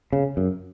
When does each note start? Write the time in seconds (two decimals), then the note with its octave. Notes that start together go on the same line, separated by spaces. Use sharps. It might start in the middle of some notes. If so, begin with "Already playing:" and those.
0.13 C#3
0.37 F#2